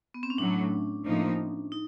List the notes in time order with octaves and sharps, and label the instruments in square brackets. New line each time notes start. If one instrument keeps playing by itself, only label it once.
[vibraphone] B3
C4
C#4
[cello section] A2 F#3 A3 [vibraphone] D4
[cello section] A2 F3 A#3 D#4
[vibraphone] D#4